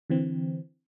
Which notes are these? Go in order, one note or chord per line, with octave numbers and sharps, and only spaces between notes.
D3 E3 C4